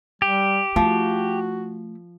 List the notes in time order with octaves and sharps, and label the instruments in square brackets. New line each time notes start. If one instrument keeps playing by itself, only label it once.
[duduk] G3 [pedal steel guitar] G4
[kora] F3 [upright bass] A3 E4 [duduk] F#4